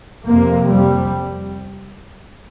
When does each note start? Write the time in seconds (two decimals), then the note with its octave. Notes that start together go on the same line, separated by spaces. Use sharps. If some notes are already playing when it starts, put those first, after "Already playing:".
0.24 F2 C3 A#3
0.69 G3